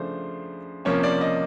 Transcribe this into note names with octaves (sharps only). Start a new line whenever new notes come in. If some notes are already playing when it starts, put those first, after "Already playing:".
Already playing: C#3 F3 A3 D4 C5
C3 F3 A#3 C#4 C#5
D5
D#5